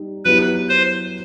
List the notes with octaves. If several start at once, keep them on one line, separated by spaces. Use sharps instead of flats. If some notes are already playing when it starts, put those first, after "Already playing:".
Already playing: G3 D#4
F#3 B3 E4 G4 B4
C5